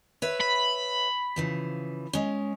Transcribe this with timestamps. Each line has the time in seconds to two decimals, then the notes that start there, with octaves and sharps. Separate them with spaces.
0.22 B4 C#5 E5
0.41 B5
1.36 C#3 E3 F3
2.13 G#3 C#4